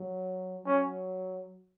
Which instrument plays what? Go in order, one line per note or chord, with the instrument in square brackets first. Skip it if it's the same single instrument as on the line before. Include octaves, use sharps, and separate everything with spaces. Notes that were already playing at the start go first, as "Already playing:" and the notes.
Already playing: [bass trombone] F#3
[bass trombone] F#3 [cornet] C#4